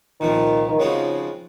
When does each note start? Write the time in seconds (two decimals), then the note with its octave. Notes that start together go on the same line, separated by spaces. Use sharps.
0.20 C2 A#2 D#3 F3 C4
0.68 D#3
0.79 C#3 F3 G#3 C4 D#4 F#4